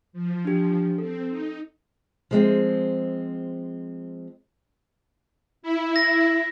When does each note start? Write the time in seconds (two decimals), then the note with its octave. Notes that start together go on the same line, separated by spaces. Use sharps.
0.13 F3
0.45 D4 G4
0.98 C4 A4
1.29 D#4
2.31 F3 G#3 C4
5.62 E4
5.96 A#6